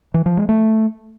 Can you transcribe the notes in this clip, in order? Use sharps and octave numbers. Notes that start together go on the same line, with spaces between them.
E3
F3
G#3
A3